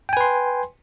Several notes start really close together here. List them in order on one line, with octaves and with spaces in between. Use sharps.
G5 G#5 B4 C6